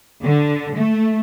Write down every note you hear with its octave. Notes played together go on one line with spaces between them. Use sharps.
D3
A3